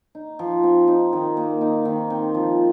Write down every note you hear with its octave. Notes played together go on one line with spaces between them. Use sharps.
D#4
F3
C4
D#4
D#3
A#3
D#4
D#3
C4
F3